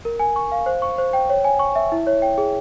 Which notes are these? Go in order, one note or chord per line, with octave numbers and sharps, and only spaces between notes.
A#4
G#5
C#6
F5
C5
C#6
C5
G5
C#5
G#5
C#6
E5
E4
C#5
G5
G#4